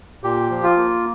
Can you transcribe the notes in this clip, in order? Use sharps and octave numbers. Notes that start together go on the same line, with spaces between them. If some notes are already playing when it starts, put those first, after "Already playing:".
A#2 G4
F3
F4
A#3